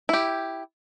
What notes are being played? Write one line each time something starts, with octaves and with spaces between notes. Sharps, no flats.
E4 G4